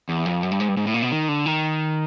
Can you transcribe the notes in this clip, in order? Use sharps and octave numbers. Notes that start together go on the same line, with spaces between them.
E2
F2
F#2
G2
G#2
G2
G#2
A2
A#2
B2
D#3
D3
D#3